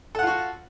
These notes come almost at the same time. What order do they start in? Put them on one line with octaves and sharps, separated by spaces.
A4 F#5 F4 F#4